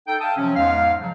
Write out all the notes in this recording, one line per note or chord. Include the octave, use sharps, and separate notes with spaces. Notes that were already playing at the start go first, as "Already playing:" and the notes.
D#4 A4 G5
E5 F5 G5 A5 D#6
C3 F3 F#3 C#4
E2 G#2 G#3 F5
C#3 F3 F#3